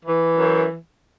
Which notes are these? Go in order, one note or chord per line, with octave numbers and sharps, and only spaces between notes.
E3
F#2